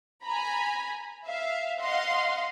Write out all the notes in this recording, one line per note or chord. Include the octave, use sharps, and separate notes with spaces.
G#5 A#5 B5
E5 F5
D#5 F5 F#5 C6